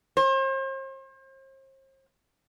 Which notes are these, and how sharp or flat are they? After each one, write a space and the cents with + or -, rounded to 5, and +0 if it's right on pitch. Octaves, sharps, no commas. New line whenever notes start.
C5 +40